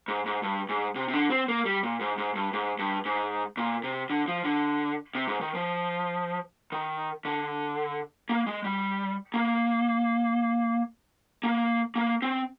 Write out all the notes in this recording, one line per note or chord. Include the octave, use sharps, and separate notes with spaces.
G#2
G#2
G2
G#2
C3
C3
D3
C4
A#3
G3
A#2
G#2
G#2
G2
G#2
G2
G#2
A#2
C3
D3
F3
D3
C3
G#2
D#3
F3
D#3
D3
A#3
G#3
G3
A#3
A#3
A#3
C4